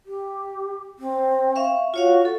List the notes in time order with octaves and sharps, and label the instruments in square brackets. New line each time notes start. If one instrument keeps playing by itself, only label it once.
[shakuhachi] G4
C4
[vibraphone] E5 F5 C#6
[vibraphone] F4 C#5 F5 [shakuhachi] F#4
[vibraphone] A4